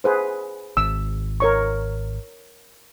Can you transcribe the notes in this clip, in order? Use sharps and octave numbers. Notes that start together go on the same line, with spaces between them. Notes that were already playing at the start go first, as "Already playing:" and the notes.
G#4 B4 C5
G#1 E6
A#4 C#5 C#6